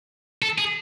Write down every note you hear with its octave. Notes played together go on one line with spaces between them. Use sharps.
A4
G#4